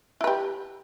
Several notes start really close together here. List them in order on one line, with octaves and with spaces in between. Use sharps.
E4 B4 G4